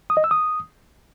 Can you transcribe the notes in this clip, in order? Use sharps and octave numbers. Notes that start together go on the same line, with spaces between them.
D#6
D#5
E6
D#6